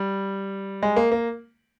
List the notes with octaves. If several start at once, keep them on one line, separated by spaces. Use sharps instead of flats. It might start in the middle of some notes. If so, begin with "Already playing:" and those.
Already playing: G3
G#3
A#3
A#3